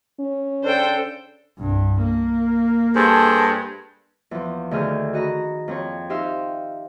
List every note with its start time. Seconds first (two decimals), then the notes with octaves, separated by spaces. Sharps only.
0.19 C#4
0.64 C#3 D4 A4 C5 G5
1.59 C2 G2
2.02 A#3
2.96 G2 G#4 A4 C5
4.31 E2 F3
4.71 D2 D3 D#3 G#4 F6 G6
5.13 F#4 D#5 A#5 B5
5.68 F2 C4 C#5
6.10 D#4 G4 C5 E5 F5